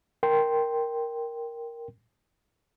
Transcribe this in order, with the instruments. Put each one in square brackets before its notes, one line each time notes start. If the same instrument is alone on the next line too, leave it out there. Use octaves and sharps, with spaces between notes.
[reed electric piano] A#4 G5 C6